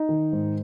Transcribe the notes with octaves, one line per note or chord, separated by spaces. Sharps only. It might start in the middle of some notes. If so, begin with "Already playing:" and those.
Already playing: D#4
D#3
G#2